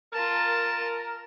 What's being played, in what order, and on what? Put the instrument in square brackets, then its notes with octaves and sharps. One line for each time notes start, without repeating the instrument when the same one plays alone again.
[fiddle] F4 A5 [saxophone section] A#4